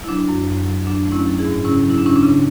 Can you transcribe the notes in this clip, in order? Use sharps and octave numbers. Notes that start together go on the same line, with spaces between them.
E4
F#3 D4
F#2
F#2
F#3
F#3 D4
A3
C#4 E4
F#3
E4 G#4
G#2
C#3 C#4 E4
F#3
E4
D4
C#3 C#4 E4
D4
C#3